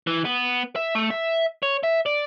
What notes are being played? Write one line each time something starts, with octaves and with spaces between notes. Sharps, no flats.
E3
B3
E5
A3
E5
C#5
E5
D5